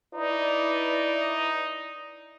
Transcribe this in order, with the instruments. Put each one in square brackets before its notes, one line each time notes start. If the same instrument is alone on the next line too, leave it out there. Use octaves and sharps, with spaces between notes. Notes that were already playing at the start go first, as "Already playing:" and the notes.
[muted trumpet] D#4 [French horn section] E4 B4 D5